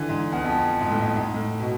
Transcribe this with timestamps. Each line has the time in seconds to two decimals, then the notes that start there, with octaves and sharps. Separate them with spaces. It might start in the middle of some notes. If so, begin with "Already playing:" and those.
Already playing: D3 E3
0.09 G#2
0.32 E2
0.44 F2
0.80 G#2
0.90 A2
1.01 G#2
1.16 G#2
1.34 A2
1.60 B2